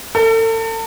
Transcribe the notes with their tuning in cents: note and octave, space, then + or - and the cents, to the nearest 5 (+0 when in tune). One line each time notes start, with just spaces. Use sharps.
A4 +40